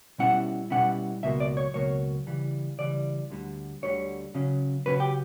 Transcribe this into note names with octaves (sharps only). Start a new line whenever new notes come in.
B2 G3 C#4 E4 F#5
B2 G3 C#4 E4 F#5
C#2 B2 F#3 A#3 E5
D5
C#5
C#2 B2 F#3 A#3 C#5
C#3 E3 G3
C#3 E3 G3 D5
D2 D3 G3
D2 D3 G3 C#5
C#3 F#3 C#4
C#3 F#3 C#4 B4
G4